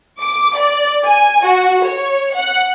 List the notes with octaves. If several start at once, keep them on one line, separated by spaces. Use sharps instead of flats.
D6
D5
G#5
F#4
C#5
F#5